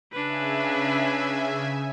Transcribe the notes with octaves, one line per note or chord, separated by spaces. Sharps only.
C#3 D4 B4 E5 G#5